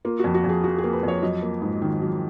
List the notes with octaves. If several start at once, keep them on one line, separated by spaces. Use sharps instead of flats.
A#3 F4
F2 F#4
F#4
F2 G#4
F3 F#4
G#4
A#3
B4
F2 C#5
F#3 D#5
A#3
G#2
D#3
F#3